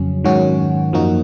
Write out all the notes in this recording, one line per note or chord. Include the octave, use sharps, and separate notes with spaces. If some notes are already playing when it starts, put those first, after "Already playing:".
Already playing: F2 C#3 F#3 C#4
G#2 D#3 F#3 C#4 F#4
F#2 F3 A#3 D#4 F#4